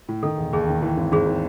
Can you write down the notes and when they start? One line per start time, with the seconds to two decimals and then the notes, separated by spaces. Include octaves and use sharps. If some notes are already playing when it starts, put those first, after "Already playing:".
0.09 A2
0.23 D#3 A4
0.37 E1
0.53 D#2 G#4
0.67 D#3
0.82 E3
0.97 G#1
1.12 G#1 G#4
1.27 E3